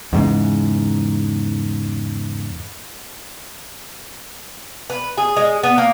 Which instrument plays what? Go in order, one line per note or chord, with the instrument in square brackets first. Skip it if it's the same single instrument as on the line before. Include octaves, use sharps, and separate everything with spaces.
[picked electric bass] E2 G#2 C#3
[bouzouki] B4
G#4
G#3
B3
A#3